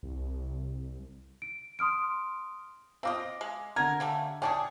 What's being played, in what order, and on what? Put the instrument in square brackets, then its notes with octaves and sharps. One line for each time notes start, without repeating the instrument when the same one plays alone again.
[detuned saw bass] C2
[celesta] D7
C6 D#6 F6 D7
[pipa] C4 F4 D#5 [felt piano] F5 D6
[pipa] G#3
[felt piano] D3 F#5 G#6 [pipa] A#4
[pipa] C#3 G3 A3
[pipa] C#4 D4 G#4 [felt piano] G5 A5 D6